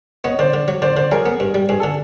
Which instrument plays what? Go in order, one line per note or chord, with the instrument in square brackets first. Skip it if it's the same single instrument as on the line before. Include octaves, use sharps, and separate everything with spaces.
[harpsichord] B3 [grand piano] C#5 D#5
[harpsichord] D3 [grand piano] C5 D5
[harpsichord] D3
F#3
[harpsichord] D3 [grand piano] C5 D5
[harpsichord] D3 [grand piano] C5 D5
[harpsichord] F#3 [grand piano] G#4 A#4
[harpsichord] B3
G2
G3
[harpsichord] G2 [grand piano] G#4
[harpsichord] D3 [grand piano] A4